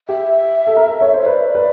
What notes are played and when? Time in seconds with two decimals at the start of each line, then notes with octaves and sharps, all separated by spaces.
0.08 G4 E5
0.67 A4
0.76 A#4
0.87 A4
1.01 C#5
1.13 C5
1.21 C#5
1.25 B4 D5
1.55 B4